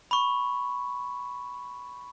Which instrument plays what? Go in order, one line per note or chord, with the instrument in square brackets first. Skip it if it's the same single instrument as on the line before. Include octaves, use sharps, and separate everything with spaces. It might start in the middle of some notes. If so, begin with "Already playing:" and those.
[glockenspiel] B5 C#6